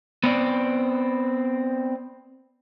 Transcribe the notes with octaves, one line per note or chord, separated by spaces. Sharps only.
B3 C4 D5